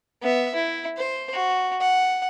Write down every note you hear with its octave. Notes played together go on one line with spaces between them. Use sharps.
B3 E5
E4
C5
F#4
F#5